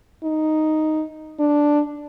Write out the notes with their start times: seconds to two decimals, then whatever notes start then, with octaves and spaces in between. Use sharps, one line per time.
0.24 D#4
1.40 D4